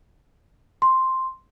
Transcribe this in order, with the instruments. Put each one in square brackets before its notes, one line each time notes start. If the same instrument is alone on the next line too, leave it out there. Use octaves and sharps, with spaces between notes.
[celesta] C6